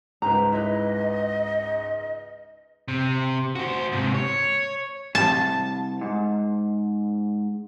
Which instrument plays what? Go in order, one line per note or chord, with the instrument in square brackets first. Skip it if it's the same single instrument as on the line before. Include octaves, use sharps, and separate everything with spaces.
[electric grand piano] C#2 G#2 [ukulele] B4 C5 A#5
[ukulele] E4 B4 [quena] D#5
[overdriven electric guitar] C3
F#4 C5
G#2 C3
C#5
[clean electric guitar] C2 [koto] A5
[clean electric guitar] G#2